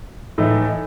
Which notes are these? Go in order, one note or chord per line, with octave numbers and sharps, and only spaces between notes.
A2 E3 A3 D#4